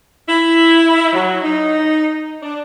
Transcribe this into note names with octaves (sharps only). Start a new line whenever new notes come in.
E4
F#3
D#4
D4